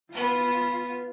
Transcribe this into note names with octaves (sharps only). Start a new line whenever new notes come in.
B3 F4 B4